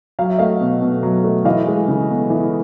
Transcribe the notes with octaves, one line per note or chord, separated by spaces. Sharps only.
F#3 F5
E5
A3 D#5 F5
B2
B2
F#3
A3
E3 D#5 F5
G#3
C#3
B3
E3